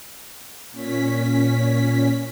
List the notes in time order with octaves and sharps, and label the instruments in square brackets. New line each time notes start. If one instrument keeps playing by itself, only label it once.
[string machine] A#2 C#4 B6